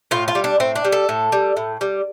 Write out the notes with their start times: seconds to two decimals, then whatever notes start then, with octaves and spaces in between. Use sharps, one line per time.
0.11 A2 F4
0.28 F4
0.35 G3
0.44 D4
0.60 A2 C4
0.75 D4
0.85 G3
0.92 A4
1.09 A2
1.32 G3
1.57 A2
1.81 G3